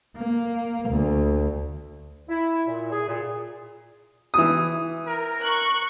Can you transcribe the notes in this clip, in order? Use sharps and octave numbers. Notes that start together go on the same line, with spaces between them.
A#3
D2
E4
A#2
G#4
A#2
E3 D#6
A#4
C#6 F#6